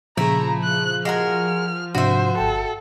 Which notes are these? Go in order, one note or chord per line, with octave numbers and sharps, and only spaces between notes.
A#2 C#3 F3 A3 E4 G#4 A#5
F#6
G#3 F#4 A#4 F6
G#2 C3 D4 F#4 C5 E5
G1 A4 G5